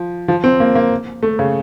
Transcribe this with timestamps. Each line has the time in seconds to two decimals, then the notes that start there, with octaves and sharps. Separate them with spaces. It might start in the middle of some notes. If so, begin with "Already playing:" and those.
Already playing: F3
0.28 F3
0.44 C4
0.60 A#3
0.75 A#3
1.23 A3
1.39 C#3